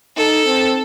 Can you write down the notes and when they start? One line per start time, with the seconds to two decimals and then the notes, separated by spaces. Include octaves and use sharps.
0.17 D#4 A4
0.45 C4